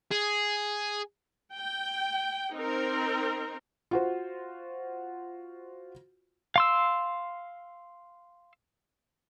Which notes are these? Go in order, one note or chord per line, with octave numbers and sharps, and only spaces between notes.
G#4
G5
C4 D#4 A#4
F4 F#4 C5
F5 C6 E6